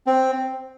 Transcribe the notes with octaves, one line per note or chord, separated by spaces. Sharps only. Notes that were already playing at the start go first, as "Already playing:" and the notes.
C4